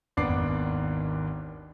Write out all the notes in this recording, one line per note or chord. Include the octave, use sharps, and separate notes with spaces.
G#1 D#2 B3 D4 D6 C7